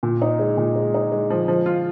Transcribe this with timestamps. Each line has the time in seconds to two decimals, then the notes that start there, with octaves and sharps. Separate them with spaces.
0.03 A#2
0.22 D#4
0.39 G#3
0.57 A#2
0.76 G#3
0.94 D#4
1.12 G#3
1.30 F3
1.48 F3
1.66 F4